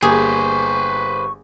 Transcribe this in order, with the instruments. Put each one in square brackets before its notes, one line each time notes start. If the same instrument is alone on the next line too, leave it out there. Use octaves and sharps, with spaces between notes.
[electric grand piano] G1 A#3 G4 [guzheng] G#4 [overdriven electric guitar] B4 C5 [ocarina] C#6